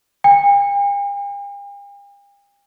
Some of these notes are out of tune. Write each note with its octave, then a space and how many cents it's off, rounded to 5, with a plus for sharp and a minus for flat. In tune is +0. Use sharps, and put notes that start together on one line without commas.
G5 +45